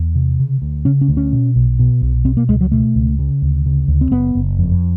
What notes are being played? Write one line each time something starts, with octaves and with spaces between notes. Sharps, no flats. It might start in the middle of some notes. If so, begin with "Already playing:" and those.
Already playing: E2
C3
C#3
D2
C#3 C#4
C#4
D2
C#4
B2
B1
B2
B1
B2 C4
A#3
C#2 G#3
F#3
B2 A3
C#2
C#3
D2
C#3
D2
C4
F#1 B3
F#1
F2